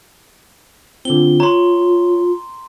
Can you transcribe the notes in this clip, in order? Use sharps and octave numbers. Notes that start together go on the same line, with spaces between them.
D3 C4 F4 G7
C#5 A#5 C6